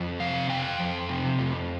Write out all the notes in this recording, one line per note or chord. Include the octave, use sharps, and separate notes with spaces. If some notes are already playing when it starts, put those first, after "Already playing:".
Already playing: F2
C3 F5
F2 G5
F2
C3
F2